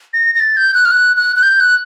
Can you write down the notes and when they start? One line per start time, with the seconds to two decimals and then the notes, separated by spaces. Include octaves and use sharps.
0.13 A#6
0.35 A#6
0.40 A6
0.57 G6
0.74 F#6
0.85 F6
0.91 F#6
1.17 F#6
1.36 F#6
1.43 G6
1.60 F#6